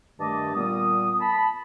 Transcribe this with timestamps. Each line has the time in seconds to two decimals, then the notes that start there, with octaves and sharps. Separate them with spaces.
0.20 G2 D#3 A3 D#5 A5 D6
0.55 A#2 G3 B3 D#6
1.20 A5 B5